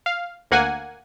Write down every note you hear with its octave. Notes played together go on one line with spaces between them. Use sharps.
F5
D2 A#3 F#5 G#5